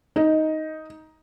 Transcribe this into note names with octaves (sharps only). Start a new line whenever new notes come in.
D#4